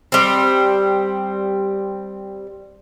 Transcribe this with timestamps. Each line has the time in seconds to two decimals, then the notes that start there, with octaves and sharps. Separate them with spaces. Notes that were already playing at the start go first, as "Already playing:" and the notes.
0.12 G3 C4